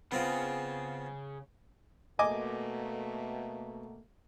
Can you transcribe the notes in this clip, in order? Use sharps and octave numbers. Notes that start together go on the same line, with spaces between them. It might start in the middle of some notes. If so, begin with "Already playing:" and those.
C#3 B3 C4 F4
B2 A3 A#3 D#5 G#5 D6